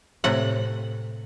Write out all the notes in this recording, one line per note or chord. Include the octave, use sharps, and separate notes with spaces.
A2 C3 F#5